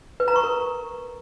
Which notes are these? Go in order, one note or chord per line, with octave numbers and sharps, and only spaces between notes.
B4
A#5
C#6
A#4